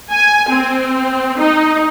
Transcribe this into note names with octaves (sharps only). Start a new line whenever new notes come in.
G#5
C4
D#4